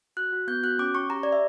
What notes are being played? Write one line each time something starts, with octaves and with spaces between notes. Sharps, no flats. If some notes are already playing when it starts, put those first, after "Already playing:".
F#4 F#6
F#4
B3 G6
F#4 F#6
C#4 D6
C#4 C#6
G4 A#5
G4 D5
E5